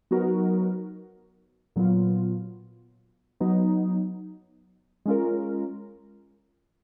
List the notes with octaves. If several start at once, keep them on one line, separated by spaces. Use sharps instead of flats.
F#3 B3 D#4 F#4 A#4
A#2 F#3 B3 F4
F#3 B3 D#4
G#3 C#4 F4 A#4